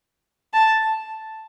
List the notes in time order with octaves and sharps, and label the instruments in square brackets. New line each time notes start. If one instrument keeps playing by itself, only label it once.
[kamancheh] A5